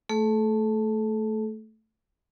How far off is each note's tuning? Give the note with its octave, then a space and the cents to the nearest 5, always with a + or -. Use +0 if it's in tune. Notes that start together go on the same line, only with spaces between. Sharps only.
A3 +0 A4 -35